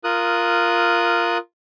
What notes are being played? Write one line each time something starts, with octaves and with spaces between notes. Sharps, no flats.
F4 A#4 D#6 F#6